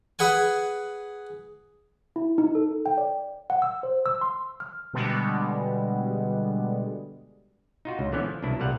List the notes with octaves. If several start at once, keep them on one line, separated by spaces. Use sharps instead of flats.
G#4 B4 F#5 G#5
E4
D#4
A4
G5
D5
F#5
E6
C5
E6
C6
F6
B2 D3 G3 G#3 B3
D#4 F4 F#4
C#2
D3 E3 F3 B3 C#4
F3
C2 B2 D4 E4
C2 A#2 G3 F5 F#5